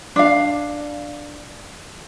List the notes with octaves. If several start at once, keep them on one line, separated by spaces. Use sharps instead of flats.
D4 F5